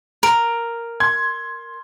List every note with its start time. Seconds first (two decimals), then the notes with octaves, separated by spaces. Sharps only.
0.23 A#4 D7
1.00 C6 G#6